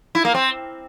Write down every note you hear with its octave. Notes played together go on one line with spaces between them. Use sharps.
E4
A#3
C4